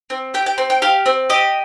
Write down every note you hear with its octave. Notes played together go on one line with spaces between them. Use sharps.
C4
G4 G5
G5
C4
G5
G4 F5
C4
G4 D#5